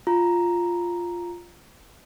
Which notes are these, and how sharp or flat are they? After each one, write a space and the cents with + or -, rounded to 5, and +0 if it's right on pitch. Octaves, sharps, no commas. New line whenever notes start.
F4 +0 A#5 +0